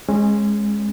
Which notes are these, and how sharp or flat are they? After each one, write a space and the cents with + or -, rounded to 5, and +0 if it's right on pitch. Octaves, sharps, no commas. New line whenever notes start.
G#3 +0 C#4 -25